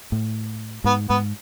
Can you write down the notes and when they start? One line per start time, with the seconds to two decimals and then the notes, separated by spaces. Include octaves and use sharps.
0.12 A2
0.84 G#2 B3
1.09 G#2 B3